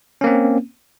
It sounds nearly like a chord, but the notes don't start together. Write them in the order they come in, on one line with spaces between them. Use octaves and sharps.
C#4 A#3 C4